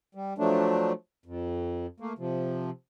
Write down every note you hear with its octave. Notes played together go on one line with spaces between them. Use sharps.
G3
F3 F#3 A3 D4
F2
A3 A#3
C3 F3